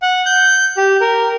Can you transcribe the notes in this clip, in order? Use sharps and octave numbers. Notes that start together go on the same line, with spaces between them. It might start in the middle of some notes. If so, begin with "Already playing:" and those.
F#5
G6
G4
A#4